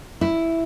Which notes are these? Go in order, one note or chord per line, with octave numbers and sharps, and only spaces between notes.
E4